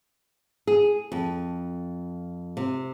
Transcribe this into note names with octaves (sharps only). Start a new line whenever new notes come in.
G#4
F2
C3